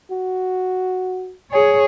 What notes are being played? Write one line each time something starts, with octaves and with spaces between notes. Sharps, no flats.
F#4
G#4 C#5